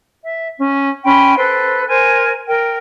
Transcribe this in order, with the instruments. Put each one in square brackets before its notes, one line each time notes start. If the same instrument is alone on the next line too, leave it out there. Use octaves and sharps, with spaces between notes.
[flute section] E5
C#4
C#4 G5 B5 C6
A4 B4 C5 F#6
A#4 C5 G#5
A#4 G5